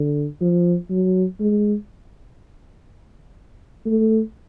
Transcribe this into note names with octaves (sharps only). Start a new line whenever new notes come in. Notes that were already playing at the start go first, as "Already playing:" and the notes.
Already playing: D3
F3
F#3
G#3
A3